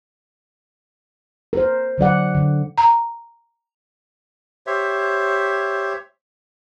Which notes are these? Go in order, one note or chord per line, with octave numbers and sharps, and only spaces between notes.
A#4 C5
D3 F#3 D5 F#5
D3
A#5
G4 C5 C#5 E5